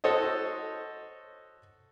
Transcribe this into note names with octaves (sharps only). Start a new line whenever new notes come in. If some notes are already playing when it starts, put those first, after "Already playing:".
F#4 A4 C5 C#5 D#5